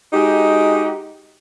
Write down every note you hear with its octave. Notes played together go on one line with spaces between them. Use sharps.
G#3 D#4 F#4 G4